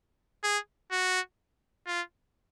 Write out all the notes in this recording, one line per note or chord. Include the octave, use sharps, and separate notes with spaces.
G#4
F#4
F4